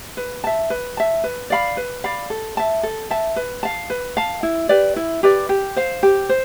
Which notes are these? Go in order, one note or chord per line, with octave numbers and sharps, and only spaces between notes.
B4
E5 A5
B4
E5 A5
B4
D5 F5 B5
B4
D5 F5 B5
A4
E5 A5
A4
E5 A5
B4
F5 A5
B4
F5 A5
E4
G4 B4 D5
E4
G4 B4 D5
G4
C5 F5
G4
C5